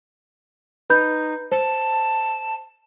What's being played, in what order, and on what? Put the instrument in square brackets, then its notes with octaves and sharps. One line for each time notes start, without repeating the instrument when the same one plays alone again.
[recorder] D#4 [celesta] B4 B5 G6
[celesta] C5 [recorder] A5